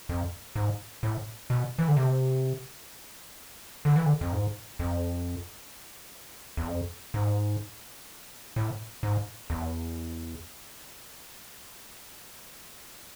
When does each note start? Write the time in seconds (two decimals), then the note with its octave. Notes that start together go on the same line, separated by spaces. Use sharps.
0.09 F2
0.56 G#2
1.03 A2
1.50 B2
1.78 E3
1.88 D3
1.97 C3
3.85 D3
3.96 E3
4.06 D3
4.21 F2
4.33 G#2
4.79 F2
6.57 E2
6.67 F2
7.14 G#2
8.56 A2
9.03 G#2
9.50 E2